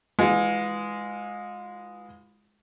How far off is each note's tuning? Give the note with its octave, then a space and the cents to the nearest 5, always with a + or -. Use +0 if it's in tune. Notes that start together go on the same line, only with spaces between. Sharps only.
E3 +0 G#3 +0 F4 +40